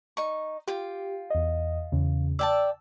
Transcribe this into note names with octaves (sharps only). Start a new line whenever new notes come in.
D#4 C#6
F4 G4 G5
E2 D#5
E2 C#3
D5 G5 A5 E6